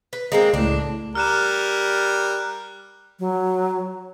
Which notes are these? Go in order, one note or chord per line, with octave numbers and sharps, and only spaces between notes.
B4
G#3 A#3 C4
C#2 A2 D4
G3 A#4 F6 F#6 E7
F#3